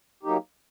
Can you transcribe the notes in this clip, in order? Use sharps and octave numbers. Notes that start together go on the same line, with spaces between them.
F#3 A#3 D#4 G4